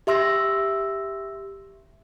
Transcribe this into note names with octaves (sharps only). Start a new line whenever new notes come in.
G4 E5 C6 E6 A#6